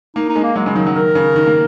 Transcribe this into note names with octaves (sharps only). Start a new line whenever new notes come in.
A#3 D#4
D#4
G#3
A#3
F#3 G#3
C#3 G#3
D#3 F#3
F#3
D#3 A#4
C#3
D#3
A#3